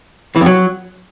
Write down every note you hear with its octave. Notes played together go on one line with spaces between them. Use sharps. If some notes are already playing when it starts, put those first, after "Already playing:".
E3
F2
F#3